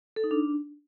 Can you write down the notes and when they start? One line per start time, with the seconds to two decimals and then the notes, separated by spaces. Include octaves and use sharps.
0.16 A4
0.24 D#4
0.31 D4